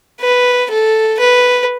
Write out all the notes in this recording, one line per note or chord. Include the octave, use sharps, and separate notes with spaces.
B4
A4
B4